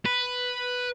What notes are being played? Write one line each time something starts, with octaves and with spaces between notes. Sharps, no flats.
B4